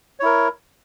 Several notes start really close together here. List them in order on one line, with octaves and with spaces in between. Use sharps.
C#5 E4 A#4